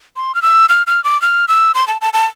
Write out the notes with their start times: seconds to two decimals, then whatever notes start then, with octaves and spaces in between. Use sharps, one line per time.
0.16 C6
0.35 F6
0.42 E6
0.69 F6
0.87 F6
1.04 D6
1.22 F6
1.48 E6
1.75 C6
1.88 A5
2.01 A5
2.13 A5